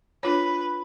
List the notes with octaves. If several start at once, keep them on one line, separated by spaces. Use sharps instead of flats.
D4 F4 B4 C#5